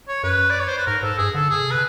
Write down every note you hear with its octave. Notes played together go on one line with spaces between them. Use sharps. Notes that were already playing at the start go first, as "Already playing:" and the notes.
C#5
F#2 B4
D5
C#5
C5
B4
G#2 A#4
G#2 A4
G2 G#4
D3 A4
C#3 G#4
C3
B4